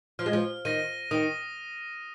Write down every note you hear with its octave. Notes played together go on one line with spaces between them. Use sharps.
F3 F6
G#3
F3
D#3 A#6 D#7
D#3 D#6